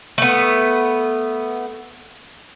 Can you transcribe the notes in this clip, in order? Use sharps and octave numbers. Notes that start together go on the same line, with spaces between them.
A3 B3